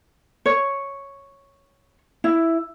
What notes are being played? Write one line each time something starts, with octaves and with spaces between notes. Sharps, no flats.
C#5
E4